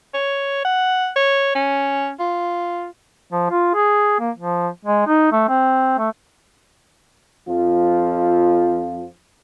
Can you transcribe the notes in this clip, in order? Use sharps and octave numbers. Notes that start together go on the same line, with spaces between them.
C#5
F#5
C#5
C#4
F4
F3
F4
G#4
A#3
F3
G#3
D#4
A3
C4
A3
F2 F3 F4